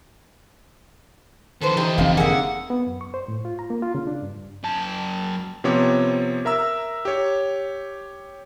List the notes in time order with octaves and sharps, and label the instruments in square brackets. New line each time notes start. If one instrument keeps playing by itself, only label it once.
[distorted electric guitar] D#3 F3 [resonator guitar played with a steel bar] A4 B4 C5
[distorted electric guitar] E3 A#4 [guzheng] D#4 G4
[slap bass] F1 C4 [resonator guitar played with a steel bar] A#2 D3 F5
[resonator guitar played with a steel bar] D3 A#3 [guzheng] G#4 E5 [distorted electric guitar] F#5
[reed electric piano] B3
F#2
C#6
C5
A2
F4
A#5
A#3
F4
C#3
D4
G2
[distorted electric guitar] F#2 A5
[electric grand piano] C3 F3 B3 C4 C#5 D6
A#4 E5 A#5 E6
G4 C#5